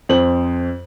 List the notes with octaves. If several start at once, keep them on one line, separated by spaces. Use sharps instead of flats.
F2 C5 F#7